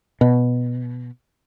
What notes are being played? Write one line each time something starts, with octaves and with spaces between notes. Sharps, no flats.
B2